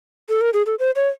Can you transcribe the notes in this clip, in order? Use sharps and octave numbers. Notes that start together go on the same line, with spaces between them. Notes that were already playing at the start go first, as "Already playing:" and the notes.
A4
A#4
G#4
A4
C5
C#5